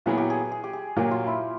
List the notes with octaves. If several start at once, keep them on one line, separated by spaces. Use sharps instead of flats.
A#2 F#3 B3 E4 G#4
G4
G#4
G#4
G4
G#4
A#2 F#3 A#3 G4
F4
E4